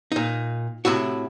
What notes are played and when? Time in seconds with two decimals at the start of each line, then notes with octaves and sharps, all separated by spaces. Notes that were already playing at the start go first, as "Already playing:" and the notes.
0.12 A#2 D#4
0.85 A2 C3 E4 F#4